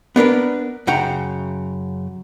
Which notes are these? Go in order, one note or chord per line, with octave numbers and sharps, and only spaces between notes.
B3 D4 A#4 B4
F#2 C#3 F#5 G5 A#5